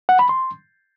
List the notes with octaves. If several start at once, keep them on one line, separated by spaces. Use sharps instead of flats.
F#5
B5
C6